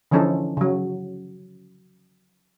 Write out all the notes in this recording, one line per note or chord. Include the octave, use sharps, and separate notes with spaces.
D3 E3 F3 C#4 D#4 A4
C#3 F#3